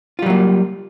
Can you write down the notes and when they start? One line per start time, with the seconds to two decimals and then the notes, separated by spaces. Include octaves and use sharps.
0.19 F4
0.22 G3
0.26 F#3
0.30 A#3